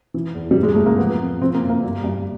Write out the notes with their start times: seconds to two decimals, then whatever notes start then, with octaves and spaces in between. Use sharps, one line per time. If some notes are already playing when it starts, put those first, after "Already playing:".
0.14 E3
0.35 E2
0.51 G3
0.56 G#2
0.63 G#3
0.75 G#2 A3
0.86 A#3
0.98 F3 B3
1.20 F2
1.41 F3 C4
1.55 A#3
1.62 F2
1.70 A#3
1.83 G2
2.04 G2